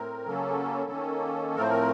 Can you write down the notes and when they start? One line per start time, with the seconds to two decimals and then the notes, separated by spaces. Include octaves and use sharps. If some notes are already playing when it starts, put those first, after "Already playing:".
Already playing: A2 C4 A#4
0.27 C#3 F#3 A#3 C#4 A4
0.91 D#3 A#3 C#4
1.56 A2 F3 A3 C4 A#4
1.62 C5
1.69 A#4